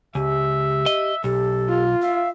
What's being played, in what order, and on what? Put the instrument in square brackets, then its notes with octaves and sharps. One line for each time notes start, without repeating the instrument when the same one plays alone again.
[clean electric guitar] C#2 [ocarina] G4 [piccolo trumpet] E5
[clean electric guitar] D#5
[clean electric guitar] B1 [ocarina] G4 [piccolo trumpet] A4
[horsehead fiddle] F4
[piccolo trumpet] E5 [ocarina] F5